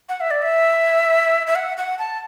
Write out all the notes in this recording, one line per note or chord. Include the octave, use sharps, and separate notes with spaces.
F#5
E5
D5
E5
E5
F#5
F#5
A5